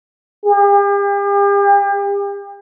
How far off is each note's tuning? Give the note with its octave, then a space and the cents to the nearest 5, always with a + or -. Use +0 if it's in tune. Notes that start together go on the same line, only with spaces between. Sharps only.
G4 +40